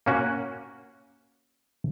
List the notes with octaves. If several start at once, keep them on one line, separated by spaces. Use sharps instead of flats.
A#3 C#4 F#4